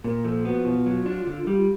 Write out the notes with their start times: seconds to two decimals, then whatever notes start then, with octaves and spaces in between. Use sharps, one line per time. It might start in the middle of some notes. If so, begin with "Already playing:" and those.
0.04 A#2 A#4
0.25 F3 A4
0.45 B3 F#4
0.65 B2 F4
0.86 F#3
1.06 D4
1.27 D3
1.47 G3